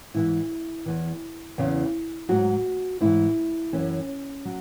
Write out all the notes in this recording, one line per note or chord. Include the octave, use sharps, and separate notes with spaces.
G#2 E3 E4
E2 E3
E2 C#3 E3
G#2 F#3 F#4
G#2 E3 E4
F#2 E3 C#4
F#3